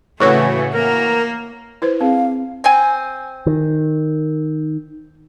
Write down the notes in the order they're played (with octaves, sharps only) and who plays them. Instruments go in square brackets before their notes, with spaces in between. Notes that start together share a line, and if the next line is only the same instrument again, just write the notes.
[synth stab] A2 E3 F#4 [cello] C#3 A3 [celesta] C#5 C#6
[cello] A#3 [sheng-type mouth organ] A#4
[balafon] E4 B4 C5
[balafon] C4 G#4 [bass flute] F5
[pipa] C4 G5 G#5
[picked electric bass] D#3